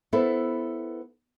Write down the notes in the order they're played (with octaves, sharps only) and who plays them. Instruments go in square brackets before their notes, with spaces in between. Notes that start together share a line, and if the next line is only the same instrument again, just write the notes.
[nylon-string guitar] B3 E4 A4 B4 C5